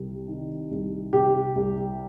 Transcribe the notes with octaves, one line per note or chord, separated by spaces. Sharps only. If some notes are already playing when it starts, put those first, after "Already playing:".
Already playing: C2 C3
D#3
C2
C3 G4
C2